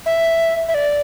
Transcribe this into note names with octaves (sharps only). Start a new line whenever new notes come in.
E5
E5
D5